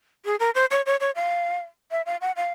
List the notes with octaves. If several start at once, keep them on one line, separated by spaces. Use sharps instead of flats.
G#4
A#4
C5
C#5
C#5
C#5
F5
E5
F5
F#5
F5